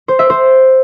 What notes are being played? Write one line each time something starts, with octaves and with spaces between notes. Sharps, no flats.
C5
E5
C5